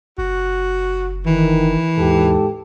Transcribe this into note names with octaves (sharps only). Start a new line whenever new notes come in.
F#1 F#4
D#3 E3
D#2 G#2 G4 A4